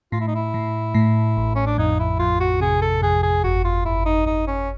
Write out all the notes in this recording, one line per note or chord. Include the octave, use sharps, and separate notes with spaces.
A2 F4
E4
D#4
E4
A2
A2
A1
C#4
D4
F2 D#4
E4
F2 F4
F#4
C3 G#4
A4
F2 G#4
G#4
G1 F#4
F4
G1 E4
D#4
G1 D#4
C#4